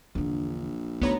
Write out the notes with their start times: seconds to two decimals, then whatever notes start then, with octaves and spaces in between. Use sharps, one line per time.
0.15 A#1 E2 D3
1.01 D2 A3 B3 D#4 C#5 A#5